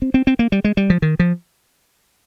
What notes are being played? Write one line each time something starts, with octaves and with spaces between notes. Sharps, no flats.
C4
C4
C4
A#3
G3
G#3
G3
F3
D#3
F3